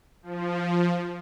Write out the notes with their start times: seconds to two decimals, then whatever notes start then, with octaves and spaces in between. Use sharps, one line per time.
0.23 F3